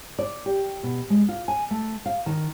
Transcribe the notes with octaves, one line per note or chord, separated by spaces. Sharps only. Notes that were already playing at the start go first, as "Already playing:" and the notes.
D5
G4
B2
G#3
F4
G#5
A3
F5
D#3